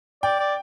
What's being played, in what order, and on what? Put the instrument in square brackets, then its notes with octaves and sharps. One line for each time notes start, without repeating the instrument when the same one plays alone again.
[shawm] D5 [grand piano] G5
[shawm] D5